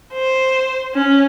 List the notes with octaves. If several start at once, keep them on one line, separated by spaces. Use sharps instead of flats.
C5
C#4